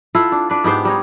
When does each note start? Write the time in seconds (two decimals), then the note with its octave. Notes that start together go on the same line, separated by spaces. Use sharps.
0.15 E4 F4 A4 F#5
0.32 D4
0.50 D4 B4
0.64 G#2 B3 G4 C5
0.85 G3 D#4 C#5